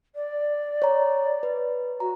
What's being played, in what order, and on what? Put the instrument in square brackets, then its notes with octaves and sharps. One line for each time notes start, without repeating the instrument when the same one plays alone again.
[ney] D5
[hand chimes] C#5 A#5
B4
[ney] F#4 [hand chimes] A#5